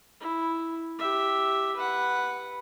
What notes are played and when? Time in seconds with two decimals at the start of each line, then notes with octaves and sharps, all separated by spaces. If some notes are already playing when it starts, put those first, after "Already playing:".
0.20 E4
0.99 G4 E5
1.76 B4 F#5